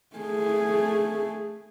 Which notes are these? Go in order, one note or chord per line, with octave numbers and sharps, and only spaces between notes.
A3 G#4